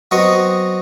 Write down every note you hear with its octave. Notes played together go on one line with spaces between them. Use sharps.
F#3 B3 C4 D#5 C#6